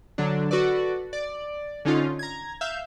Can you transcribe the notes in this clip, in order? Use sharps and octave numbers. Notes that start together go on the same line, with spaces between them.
D3 F#3 D4
F#4 A4 B4 D5
D5
D3 C#4 D#4 F4
A#5 G#6
E5 F5 G6